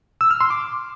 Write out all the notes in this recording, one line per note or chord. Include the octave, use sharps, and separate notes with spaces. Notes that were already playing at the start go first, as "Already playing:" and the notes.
E6
F6
C6
D6